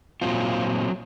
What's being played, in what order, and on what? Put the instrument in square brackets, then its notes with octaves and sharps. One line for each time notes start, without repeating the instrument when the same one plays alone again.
[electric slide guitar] A#2 F#3 C4 F4